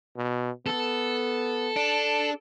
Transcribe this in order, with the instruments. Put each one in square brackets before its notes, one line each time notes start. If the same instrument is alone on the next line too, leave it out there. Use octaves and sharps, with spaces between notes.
[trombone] B2
[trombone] B3 [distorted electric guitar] A4
[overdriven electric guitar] D4